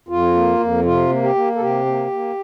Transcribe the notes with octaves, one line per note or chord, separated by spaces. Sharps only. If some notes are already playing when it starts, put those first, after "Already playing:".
F2 F4
A#3
F2
C3 F4
A#3
G4
A#3
A4
C3 G4
A#3
A#3